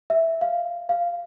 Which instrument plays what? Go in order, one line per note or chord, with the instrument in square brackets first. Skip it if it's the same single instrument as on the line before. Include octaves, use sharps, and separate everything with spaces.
[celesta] E5
F5
F5